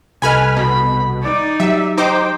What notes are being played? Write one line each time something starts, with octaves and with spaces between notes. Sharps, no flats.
C2 A4 B4 D#5 G#5 B5 F6
B2 B5
D#4 D5
F#3 G4 E5
D#4 C5 G5 D6